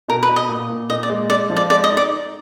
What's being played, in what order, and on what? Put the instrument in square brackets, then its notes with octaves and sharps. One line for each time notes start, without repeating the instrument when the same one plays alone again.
[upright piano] B2 [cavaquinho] A#4
[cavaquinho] B4
[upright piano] B2
[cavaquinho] D#5
[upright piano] A#2
A#2
[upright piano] A#2 [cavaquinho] D#5
[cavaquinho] D5
[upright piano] G#3
[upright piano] G#3 [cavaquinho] D5
[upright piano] F3
[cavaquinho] D5
[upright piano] G#3 [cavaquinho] D5
[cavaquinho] D#5
[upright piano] D#4
[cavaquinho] D5
[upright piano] D#4